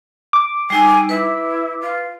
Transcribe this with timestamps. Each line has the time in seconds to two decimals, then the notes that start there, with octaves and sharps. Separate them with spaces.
0.33 D6
0.70 G3 D#4 G#5 E6
1.09 E4 B4
1.81 F4